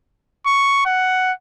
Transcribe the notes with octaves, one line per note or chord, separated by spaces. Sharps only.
C#6
F#5